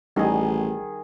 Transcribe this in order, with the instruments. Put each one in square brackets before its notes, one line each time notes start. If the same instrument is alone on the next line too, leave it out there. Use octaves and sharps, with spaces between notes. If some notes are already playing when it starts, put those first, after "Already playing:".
[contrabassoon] A1 [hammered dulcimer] D#3 G#4 [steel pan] G3 D#4